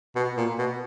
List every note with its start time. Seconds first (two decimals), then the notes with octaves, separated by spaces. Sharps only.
0.16 B2
0.37 A#2
0.58 B2